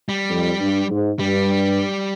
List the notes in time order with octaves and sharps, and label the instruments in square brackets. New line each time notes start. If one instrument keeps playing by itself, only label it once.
[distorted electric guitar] G3
[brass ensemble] F2
G2
G#2
[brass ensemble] G2 [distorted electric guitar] G3